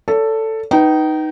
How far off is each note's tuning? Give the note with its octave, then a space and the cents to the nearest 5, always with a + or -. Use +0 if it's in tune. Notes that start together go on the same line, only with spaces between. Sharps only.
A4 +10 C#5 +40
D#4 +0 B4 +0 G5 -35